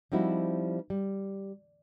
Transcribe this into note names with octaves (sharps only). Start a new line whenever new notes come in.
F3 G3 C4 D#4 E4 F#4
G3